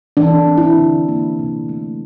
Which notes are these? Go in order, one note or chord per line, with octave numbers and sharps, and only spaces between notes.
E3 D4
C4
E4
D3
A#3
C3
A3